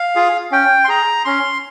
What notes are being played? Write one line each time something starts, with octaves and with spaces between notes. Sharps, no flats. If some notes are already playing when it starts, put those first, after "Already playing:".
Already playing: F5
F4 G#4
C#4 G5
C6
G#4 A#5
C#4 C6